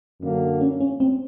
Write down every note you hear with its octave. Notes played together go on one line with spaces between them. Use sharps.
F#2 D3 F#3 A#3
C#4
C#4
C4